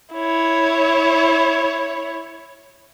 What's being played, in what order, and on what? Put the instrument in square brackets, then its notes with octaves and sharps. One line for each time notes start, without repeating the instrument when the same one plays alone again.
[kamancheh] E4 C#5